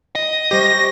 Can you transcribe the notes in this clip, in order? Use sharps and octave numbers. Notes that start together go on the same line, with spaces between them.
D#5
G3 G4 C5 C#6 A#6